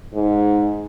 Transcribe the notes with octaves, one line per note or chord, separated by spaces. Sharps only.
G#2